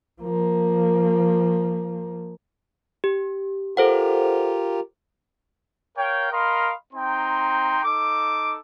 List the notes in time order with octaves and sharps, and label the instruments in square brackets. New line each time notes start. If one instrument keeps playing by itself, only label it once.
[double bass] F3 A#3
[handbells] G4
[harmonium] F4 G4 A#4 [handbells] A4 C5 F#5
[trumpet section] A#4 C#5 F5 G5
A#4 D#5 F5 B5 C6
C4 D#4 G5 A#5 C6
D#4 A4 D6